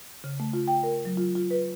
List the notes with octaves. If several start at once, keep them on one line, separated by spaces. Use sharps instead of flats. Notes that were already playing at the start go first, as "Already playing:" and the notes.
C#3
A3
F4
G5
A#4
F#3
F4
F4
B4